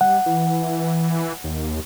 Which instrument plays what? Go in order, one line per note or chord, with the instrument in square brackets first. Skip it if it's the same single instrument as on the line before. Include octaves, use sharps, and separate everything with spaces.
[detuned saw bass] G3 [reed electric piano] F#5
[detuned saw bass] E3
D#2